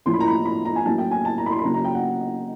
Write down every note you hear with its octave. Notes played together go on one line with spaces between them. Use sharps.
A2 F3 A#3 C#4 C6
B5
A#5
B5
B5
A#5
G#5
A2 F#3 A#3 C#4 A5
G5
G#5
A5
A#5
B5
C6
B5
C#3 F#3 A#3 C#4 A#5
A#5
G5
F#5